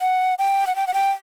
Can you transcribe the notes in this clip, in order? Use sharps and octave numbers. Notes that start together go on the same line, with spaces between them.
F#5
G5
F#5
G5
F#5
G5